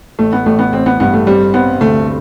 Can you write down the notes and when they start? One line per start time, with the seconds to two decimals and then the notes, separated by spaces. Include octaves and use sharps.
0.19 A1 A3
0.33 B3
0.46 A1 A3
0.59 B3
0.72 A1 C4
0.86 B3
1.00 G2 B3
1.14 A3
1.27 G3 C4
1.54 B3 C4
1.81 D2 A3